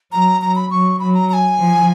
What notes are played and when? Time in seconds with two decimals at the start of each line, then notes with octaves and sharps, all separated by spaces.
0.12 F#3 A#5
0.41 F#3 A#5
0.56 B5
0.71 F#3 C#6
1.00 F#3 B5
1.14 A#5
1.29 A#5
1.33 G#5
1.58 F3